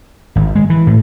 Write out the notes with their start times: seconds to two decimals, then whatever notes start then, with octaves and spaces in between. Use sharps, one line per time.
0.36 G#1
0.56 G#3
0.70 E3
0.87 A2